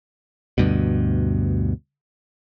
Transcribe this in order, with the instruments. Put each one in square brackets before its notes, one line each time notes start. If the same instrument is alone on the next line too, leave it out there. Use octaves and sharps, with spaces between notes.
[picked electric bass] D2 G2 B2